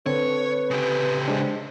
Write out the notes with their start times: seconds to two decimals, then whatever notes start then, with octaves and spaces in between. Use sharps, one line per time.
0.06 D3 C4 A4 B4 C#5
0.71 C#3 G4
1.28 G#3 D4 C5